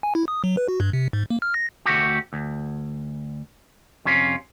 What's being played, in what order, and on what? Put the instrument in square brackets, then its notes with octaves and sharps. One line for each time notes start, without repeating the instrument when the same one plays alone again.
[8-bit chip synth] G#5
E4
D#6
F#3
B4
F#4
G2
C3
G#2
A#3
F6
A#6
[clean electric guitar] D2 A3 F#4 G4
D2
F2 C3 C#4 F4